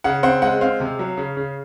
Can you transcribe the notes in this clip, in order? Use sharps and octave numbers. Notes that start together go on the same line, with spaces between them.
C#3 F#5
C4 F#5
G#3 F#5
C4 F5
C3
F#3
C#3
C#3